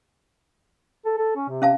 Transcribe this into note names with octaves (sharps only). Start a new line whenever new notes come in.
A4
A4
C#4
C3
C#4 F5 A5